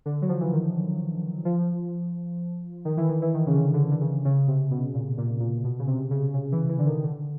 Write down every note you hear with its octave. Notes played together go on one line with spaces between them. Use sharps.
D3
F#3
F3
E3
D#3
F3
D#3
E3
D#3
E3
D#3
C#3
D3
D3
C#3
D3
C#3
C#3
C3
B2
A#2
A#2
A#2
B2
C#3
C3
C#3
C#3
E3
E3
D3
D#3
D3